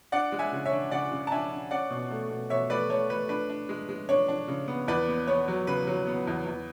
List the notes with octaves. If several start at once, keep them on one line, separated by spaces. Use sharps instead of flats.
D4 D5 F#5
G#3
E5 G#5
C#3
C#5 E5
D4
C#3 D5 F#5
C#3
A5
D4 E5 G#5
D4
C#4 D5 F#5
B2
A3
B2
B2 C#5 E5
A3 B4 D5
A3 C#5
A3 B4
D4 B4
D4
G#3
G#3
D4 C#5
D4
C#3
B3
E2 B4 D5
B3
B3 C#5
F#3
C#3 B4
F#3
B3
E2
E2